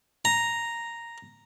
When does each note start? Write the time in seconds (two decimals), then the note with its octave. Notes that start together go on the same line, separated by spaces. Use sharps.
0.25 A#5